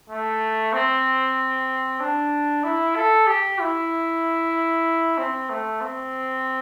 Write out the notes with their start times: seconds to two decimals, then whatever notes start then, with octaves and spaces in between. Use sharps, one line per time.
0.10 A3
0.73 C4
2.00 D4
2.63 E4
2.96 A4
3.27 G4
3.59 E4
5.18 C4
5.49 A3
5.81 C4